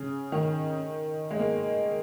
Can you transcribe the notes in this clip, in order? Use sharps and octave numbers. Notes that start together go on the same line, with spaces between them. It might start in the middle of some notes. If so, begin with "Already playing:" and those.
Already playing: C#3
D#3
G#3
A#3